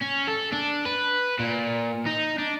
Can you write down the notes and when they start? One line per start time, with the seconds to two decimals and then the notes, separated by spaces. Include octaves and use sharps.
0.02 C#4
0.28 A4
0.52 D4
0.85 B4
1.39 A#2
2.07 D#4
2.39 D4